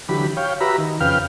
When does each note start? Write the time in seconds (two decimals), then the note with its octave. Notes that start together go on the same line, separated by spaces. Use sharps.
0.09 D3 E3 F#3 G4 B5
0.37 C#5 F5 G5
0.61 F#4 G4 B4 E5 A#5 B5
0.78 D#3
1.00 F2 C#3 B4 F5 G5 F6